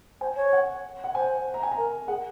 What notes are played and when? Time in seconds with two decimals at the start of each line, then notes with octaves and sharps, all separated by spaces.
0.21 C5 G#5
0.36 C#5
0.53 F#5
1.04 F#5
1.15 C5 G#5
1.54 A#5
1.63 G#5
1.72 A#5
1.77 A#4
2.08 G#4 F#5